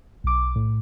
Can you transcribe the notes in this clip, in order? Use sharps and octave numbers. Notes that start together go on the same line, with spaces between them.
B1 D6
A2